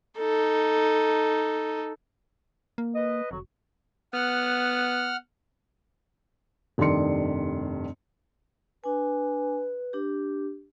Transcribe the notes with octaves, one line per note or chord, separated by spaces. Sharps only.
D#4 A4
A#3
B4 D#5
F1 D3 F#3 F#4
B3 F#5 F6
F1 G2 D#3 D5 C6 C#7
D4 B4 G#5
D4 G4